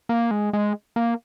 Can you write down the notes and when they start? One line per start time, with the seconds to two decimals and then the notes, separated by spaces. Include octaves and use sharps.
0.09 A#3
0.31 G#3
0.53 G#3
0.96 A#3